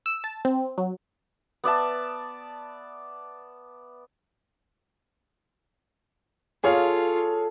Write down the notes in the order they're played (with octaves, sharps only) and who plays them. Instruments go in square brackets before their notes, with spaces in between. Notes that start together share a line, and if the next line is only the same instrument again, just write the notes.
[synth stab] E6
A5
C4
F#3
[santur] B3 D5 E5 A5
[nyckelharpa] F4 [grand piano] G#4 C#5 F5 [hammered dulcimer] A4